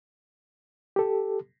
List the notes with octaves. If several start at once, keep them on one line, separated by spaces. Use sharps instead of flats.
G4 A4